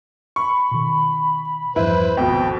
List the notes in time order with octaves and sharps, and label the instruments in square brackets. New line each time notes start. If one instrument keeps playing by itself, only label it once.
[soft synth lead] B5 [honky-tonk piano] C#6
[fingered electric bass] B2 D#3
[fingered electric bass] E2 G2 F3 [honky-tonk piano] E4 [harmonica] B4 C5
[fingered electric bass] D#1 G#1 [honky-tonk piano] F2 B2 [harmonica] G5